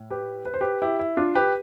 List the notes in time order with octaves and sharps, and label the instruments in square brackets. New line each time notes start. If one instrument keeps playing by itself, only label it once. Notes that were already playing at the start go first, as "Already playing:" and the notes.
Already playing: [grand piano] A2
G4 B4
B4
C5
G4 B4
E4 G4
E4
D4 F4
G4 B4